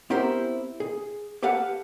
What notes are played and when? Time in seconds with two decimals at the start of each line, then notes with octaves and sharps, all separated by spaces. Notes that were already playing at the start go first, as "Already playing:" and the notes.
0.10 B3 C4 E4 G4 A#4 C5
0.80 G#4
1.43 G4 A4 B4 F5 F#5 A5